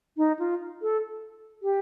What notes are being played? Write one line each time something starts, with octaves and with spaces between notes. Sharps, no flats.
D#4
F4
A4
G4